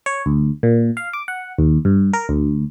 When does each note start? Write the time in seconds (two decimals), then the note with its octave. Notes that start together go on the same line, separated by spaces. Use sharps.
0.06 C#5
0.26 D2
0.63 A#2
0.97 F5
1.13 D6
1.28 F#5
1.59 D#2
1.85 G2
2.13 A#4
2.29 D2